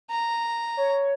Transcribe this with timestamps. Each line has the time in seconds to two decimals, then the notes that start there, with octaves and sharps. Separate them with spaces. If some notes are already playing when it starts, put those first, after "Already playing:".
0.10 A#5
0.77 C#5